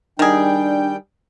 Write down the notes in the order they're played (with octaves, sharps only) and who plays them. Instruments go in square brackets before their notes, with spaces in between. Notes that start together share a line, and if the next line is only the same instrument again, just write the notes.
[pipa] D#3 G#4 [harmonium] G3 G5 [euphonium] D4